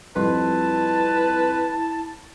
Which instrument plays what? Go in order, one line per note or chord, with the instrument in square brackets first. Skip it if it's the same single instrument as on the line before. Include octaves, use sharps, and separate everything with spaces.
[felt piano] F2 G3 C6 [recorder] E4 [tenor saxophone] B4 [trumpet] A5